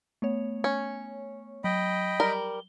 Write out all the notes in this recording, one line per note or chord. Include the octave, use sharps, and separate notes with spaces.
A3 B3 C#5
C#4
F#3 D#5 G5 B5
G3 A#4 G7